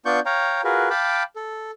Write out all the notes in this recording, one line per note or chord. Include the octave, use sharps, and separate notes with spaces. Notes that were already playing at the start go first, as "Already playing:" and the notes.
B3 D4 F4 D5 C#6 G6
C#5 F5 G5 A#5
F4 F#4 G#4 A#4 B4
F5 G5 A5 B5 D6
A4